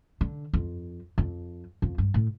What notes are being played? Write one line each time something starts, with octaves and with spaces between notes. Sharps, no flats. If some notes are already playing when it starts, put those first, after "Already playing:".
D3
F2
F2
F2
G2
A2